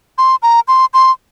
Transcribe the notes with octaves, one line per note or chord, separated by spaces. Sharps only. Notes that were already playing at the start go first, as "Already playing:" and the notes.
C6
A#5
C6
C6